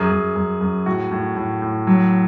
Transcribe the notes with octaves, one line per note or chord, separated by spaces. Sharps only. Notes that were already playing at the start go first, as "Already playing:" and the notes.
Already playing: F#2 G#4
F#2
F#2
F#2
A2 F#4
A2
A2
A2
F#3